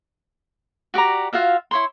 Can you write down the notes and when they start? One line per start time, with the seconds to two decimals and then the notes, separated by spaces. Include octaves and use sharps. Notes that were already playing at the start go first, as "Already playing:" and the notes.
0.94 F#4 G4 D5 A#5
1.33 F4 F#4 E5 F5
1.71 E4 C#5 C6